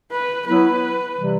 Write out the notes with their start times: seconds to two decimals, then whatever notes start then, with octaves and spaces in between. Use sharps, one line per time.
0.11 B4
0.46 F#3 B3 E4 B4
1.16 C3 E3 G3